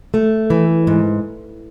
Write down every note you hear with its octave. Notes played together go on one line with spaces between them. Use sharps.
A3
E3
G#2